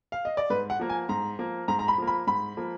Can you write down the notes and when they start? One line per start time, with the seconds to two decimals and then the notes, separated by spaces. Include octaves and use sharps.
0.12 F5
0.25 D#5
0.37 D5
0.50 G#2 B4
0.70 F#5
0.79 F3 A#3
0.90 G#5
1.09 G#2 A#5
1.39 F3 A#3
1.68 G#2 A#5
1.79 A#5
1.88 B5
1.98 F3 A#3
2.07 B5
2.27 G#2 B5
2.57 F3 A#3